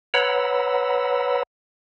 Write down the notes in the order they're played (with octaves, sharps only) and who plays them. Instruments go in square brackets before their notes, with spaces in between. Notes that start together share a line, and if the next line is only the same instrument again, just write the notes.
[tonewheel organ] B4 C#5 F#5 A#5 B5 E6